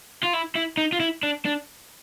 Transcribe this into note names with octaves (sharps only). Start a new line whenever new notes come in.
F4
E4
E4
D#4
F4
E4
D4
D4